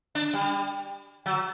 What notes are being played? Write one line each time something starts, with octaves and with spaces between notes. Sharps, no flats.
D4
G3
F#3